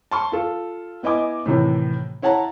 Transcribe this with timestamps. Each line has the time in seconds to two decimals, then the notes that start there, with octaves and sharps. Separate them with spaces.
0.11 A5 C6 C#6
0.32 F4 A4
1.03 B3 E4 D#5 G#5 D6
1.46 A2 C3 D#3 E3
2.22 E4 C#5 F#5 A5 A#5